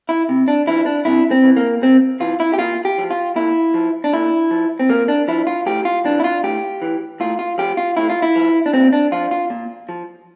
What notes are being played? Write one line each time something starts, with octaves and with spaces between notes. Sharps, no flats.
E4
C3
D4
F3 E4
D4
C3 E4
C4
E3
A#3
C3 C4
E3 F4
E4
G4
A#2 F4
G4
F3
F4
A#2 E4
F3
D4
A#2 E4
F3
C4
A#2 A#3
D4
F3 E4
F4
A2 G4
F4
E3 D4
E4
F4
A2 G4
E3
A2 F4
F4
F3 G4
F4
A2 E4
F4
E4
F3
D4
A#2 C4
D4
F3 F4
F4
A#2
F3